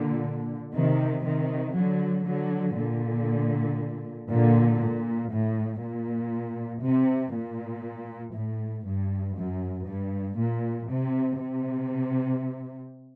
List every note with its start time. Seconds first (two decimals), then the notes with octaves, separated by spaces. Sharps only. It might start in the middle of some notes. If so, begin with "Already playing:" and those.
Already playing: A#2 D3
0.75 C3 D#3
1.26 C3 D#3
1.76 D3 F#3
2.27 D3 F#3
2.78 A#2 D3
4.30 A#2 D3
4.81 A#2
5.32 A2
5.81 A#2
6.83 C3
7.34 A#2
8.35 A2
8.86 G2
9.37 F#2
9.88 G2
10.38 A#2
10.89 C3
11.39 C3